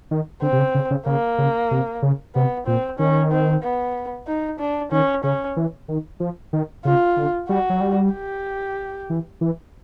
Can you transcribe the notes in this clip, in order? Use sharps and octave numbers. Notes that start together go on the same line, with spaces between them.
D#3
D3 C4
C3
C#3
C#3
C#3
C#3 A#3
C#3
C3
C#3
C3 B3
A#2 C4
D#3 C#4
C4
B3
D#4
D4
D#3 C#4
C#3 C#4
E3
D#3
F3
D#3
C#3 F4
D3
G3 F#4
F#3
G3
G4
E3
E3